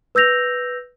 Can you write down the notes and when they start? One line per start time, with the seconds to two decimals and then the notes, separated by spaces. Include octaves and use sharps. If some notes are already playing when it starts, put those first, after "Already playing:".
0.15 B4 E6 G6 A#6 F7